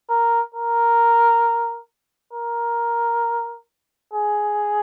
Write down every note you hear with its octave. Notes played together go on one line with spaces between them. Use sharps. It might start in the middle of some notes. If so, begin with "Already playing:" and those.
A#4
A#4
A#4
G#4